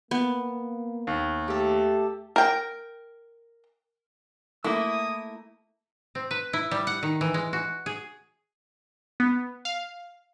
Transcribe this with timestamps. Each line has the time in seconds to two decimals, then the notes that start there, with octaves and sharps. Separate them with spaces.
0.11 A#3 B3
1.07 D#2
1.48 A3 G4 A4
2.36 A#4 G5
4.64 A3 A#3 E4 D#6
6.15 C4
6.31 B4
6.53 E4
6.71 G3
6.87 F#5
7.03 D#3
7.21 E3
7.34 G#3
7.53 F#4
7.86 G#4
9.20 B3
9.65 F5